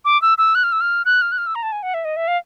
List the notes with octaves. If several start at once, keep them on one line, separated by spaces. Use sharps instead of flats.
D6
E6
E6
F#6
F6
E6
F6
F#6
F6
F#6
F6
E6
A#5
A5
G#5
F#5
E5
D#5
E5
F5